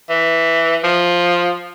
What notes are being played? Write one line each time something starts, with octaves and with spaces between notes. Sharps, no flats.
E3
F3